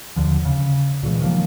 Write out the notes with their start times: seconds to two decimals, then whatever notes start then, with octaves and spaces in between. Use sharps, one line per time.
0.16 D#2 D3 F3
0.45 C#3
1.03 A#2 C#3 E3 G#3
1.21 D#3 F3 F#3 A#3